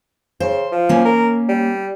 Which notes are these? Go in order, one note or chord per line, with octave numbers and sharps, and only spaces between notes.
C#3 C5
F3
A#3 C#4
A#4
G3